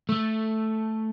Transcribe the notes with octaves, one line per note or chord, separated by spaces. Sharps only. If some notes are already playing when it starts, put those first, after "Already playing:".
A3